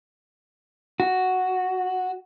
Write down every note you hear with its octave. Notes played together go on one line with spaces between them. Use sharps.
F#4